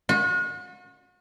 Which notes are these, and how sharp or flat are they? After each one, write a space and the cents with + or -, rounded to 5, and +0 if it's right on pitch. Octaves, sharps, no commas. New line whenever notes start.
F#4 -40